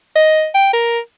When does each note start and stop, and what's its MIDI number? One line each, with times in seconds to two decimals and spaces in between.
0.16 0.47 75
0.55 0.69 79
0.73 0.99 70